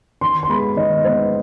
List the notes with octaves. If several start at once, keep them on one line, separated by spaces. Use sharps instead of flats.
D#3 C6
C6
G#3 B3 B5
D#3 D#5
G#3 B3 C5